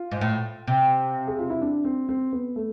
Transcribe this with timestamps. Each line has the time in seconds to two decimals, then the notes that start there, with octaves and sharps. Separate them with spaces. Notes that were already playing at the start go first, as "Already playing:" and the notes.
Already playing: F4
0.12 G#2
0.21 A2
0.67 C3
1.27 G#4
1.38 F4
1.50 E4
1.61 D4
1.84 C4
2.09 C4
2.33 B3
2.56 A3